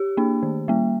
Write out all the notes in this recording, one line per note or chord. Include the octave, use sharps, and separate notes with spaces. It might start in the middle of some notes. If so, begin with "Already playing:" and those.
Already playing: G4
A#3 D4
D#3
G3 A#3